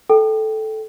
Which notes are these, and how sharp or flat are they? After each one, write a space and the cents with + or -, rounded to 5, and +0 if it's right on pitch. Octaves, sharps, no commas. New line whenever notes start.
A4 -10 G5 -5